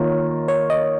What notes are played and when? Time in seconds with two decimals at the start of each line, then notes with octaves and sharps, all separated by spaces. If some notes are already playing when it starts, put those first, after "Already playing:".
Already playing: D#3 A#3 F4 A#4 C#5
0.48 C#5
0.70 D#5